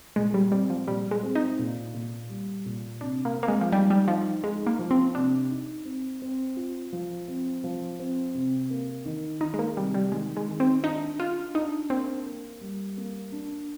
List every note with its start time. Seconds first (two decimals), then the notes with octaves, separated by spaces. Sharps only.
0.16 A#2 G#3
0.34 G3
0.52 G3 C4
0.70 F3
0.88 A#2 G3
1.11 G#3
1.23 C4
1.35 D#4
1.59 A#2
1.94 A#2
2.29 G3
2.66 A#2
3.01 C3 D4
3.25 A#3
3.37 C4
3.43 A#3
3.48 G#3
3.61 F3
3.72 G3 D#4
3.90 G3
4.08 F3 D#4
4.43 G#3 D#4
4.67 A#3
4.79 F3
4.91 C4
5.15 C3 D4
5.50 D#4
5.85 C4
6.22 C4
6.57 F4
6.93 F3
7.28 C4
7.64 F3
8.00 C4
8.35 C3
8.70 A#3
9.05 D#3
9.41 D#3 D#4
9.54 G#3
9.59 A#3
9.77 C3 G3
9.94 G3
10.12 D#3 G#3
10.37 G#3
10.48 D#3
10.60 C4
10.84 D4 D#4
11.19 D4 F4
11.55 D4 D#4
11.90 A#3 C4
12.26 A#3
12.61 G3
12.97 A#3
13.32 D4